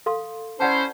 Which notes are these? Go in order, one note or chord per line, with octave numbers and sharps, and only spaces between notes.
A4 F5 C6
C#4 E4 C5 D5 F#5 A5